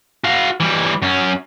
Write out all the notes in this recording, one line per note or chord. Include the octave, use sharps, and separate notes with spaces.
F#4 F5
E3 G3
F#2 C#4